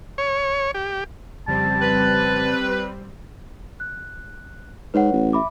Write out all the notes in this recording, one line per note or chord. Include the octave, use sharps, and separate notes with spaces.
C#5
G4
F2 C#3 G3 C4 A5
B4
F#6
G#2 B4 C#5 F#5
A1
E5 B5 D6